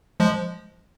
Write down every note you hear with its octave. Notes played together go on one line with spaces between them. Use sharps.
F3 G#3